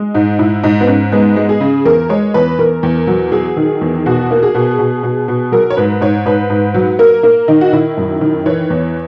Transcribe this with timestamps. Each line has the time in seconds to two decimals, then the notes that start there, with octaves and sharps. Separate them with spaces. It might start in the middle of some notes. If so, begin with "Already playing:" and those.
Already playing: G#3
0.14 G#2 D#4
0.39 G#2 E4
0.63 G#2 D#4
0.81 B3
0.87 G#2 C#4
1.12 G#3 B3
1.36 G#3
1.49 G#4
1.60 C#3
1.85 E2 A#4
2.09 G#3 C#5
2.34 E2 B4
2.59 E2 A#4
2.83 E2
3.07 F#3
3.32 F#3 G#4
3.57 D#3
3.81 E2
4.06 B2 F#4
4.31 A#3
4.43 G#4
4.55 B2
4.79 B2
5.03 B2
5.28 B2
5.52 F#3 A#4
5.70 C#5
5.77 G#2 B4
6.01 G#2 C#5
6.26 G#2 B4
6.50 G#2
6.74 F#3
6.99 A#3 A#4
7.23 A#3 A#4
7.48 D#3 D#4
7.61 F#4
7.73 D#3 E4
7.97 F#2
8.21 D#3
8.46 E3 C#5
8.70 E2